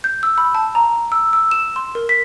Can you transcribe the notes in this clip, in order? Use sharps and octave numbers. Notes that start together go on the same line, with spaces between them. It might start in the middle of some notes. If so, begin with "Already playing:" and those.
G6
E6
B5
A5
A#5
E6
E6
E7
C6
A#4
B6